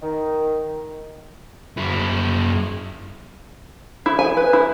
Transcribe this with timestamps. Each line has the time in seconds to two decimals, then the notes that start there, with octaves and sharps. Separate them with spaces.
0.02 D#3
1.77 F#2 E4
4.06 E4
4.19 G#5
4.37 B4
4.53 E4